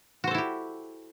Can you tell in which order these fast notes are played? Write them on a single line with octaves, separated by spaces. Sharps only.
F#4 C5 A4 E4 G4